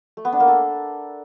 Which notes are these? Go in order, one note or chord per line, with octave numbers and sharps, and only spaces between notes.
A3
B3
D4
A#3
A4